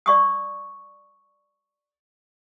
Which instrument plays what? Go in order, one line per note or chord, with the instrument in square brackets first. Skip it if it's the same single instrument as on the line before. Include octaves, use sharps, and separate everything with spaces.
[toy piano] D5 C#6 D#6